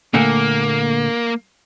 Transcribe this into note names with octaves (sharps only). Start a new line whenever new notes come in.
A#2 D3 A3 A#3